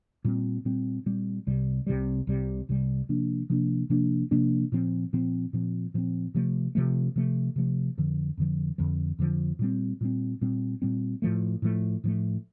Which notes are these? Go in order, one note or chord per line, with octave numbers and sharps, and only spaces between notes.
A#2 G3 C4
A#2 G3 C4
A#2 G3 C4
C2 C3 G3
C2 C3 G3
C2 C3 G3
C2 C3 G3
C3 F3 A#3 D4
C3 F3 A#3 D4
C3 F3 A#3 D4
C3 F3 A#3 D4
A#2 F3 C4
A#2 F3 C4
A#2 F3 C4
A#2 F3 C4
C3 F3 A3
C3 F3 A3
C3 F3 A3
C3 F3 A3
F2 D3 F3
F2 D3 F3
F2 D3 F3
F2 D3 F3
A#2 G3 C4
A#2 G3 C4
A#2 G3 C4
A#2 G3 C4
A2 F3 A3
A2 F3 A3
A2 F3 A3